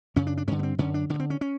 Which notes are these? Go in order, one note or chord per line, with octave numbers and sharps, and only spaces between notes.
F#2 C#3 C#4
D4
D4
G2 D3 C#4
B3
C4
F#2 D3 C#4
D4
G2 D3 C#4
C4
C#4
C#4